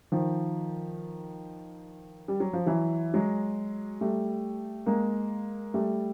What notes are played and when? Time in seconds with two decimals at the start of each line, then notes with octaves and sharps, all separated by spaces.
0.12 D#3 F3
2.28 G3
2.40 F#3
2.53 F3
2.66 E3 F#3
3.14 F#3 G#3
4.01 G3 A3
4.86 G#3 A#3
5.74 G3 A3